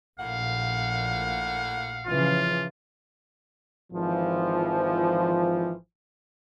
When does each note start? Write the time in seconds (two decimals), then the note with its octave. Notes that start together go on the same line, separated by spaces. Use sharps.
0.20 A#1 A2 A#3 F5 F#5
2.07 C#3 E3 F3 F4
3.92 G#1 E3 F3